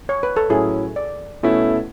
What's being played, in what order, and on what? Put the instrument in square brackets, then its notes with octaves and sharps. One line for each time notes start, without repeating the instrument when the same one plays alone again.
[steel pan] C#5
B4
A4
[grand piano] A2 F#3 C#4 E4 [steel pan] G#4
[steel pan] D5
[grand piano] B2 A3 C#4 E4